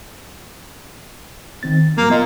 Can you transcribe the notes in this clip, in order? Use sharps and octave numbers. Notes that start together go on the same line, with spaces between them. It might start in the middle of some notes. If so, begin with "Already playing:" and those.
D#3 C4 A6
G#2 F#3 G3 A#3
A#2 B3 D#5